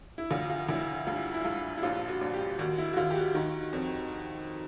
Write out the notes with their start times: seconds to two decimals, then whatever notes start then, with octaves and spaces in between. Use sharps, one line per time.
0.18 E4
0.31 D2 F4
0.50 F4
0.69 D2 E4
1.07 G2 F4
1.16 E4
1.34 E4
1.44 G2 F4
1.78 E4
1.83 A#1 F4
2.08 F#4
2.21 A#1
2.34 G4
2.59 D#2 F#4
2.78 E4
2.93 F#4
2.96 D#2 F4
3.10 G4
3.16 F#4
3.35 D#3
3.73 F2